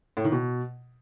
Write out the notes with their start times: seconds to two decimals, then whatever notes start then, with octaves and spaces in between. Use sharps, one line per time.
0.17 A2
0.24 D#3
0.32 B2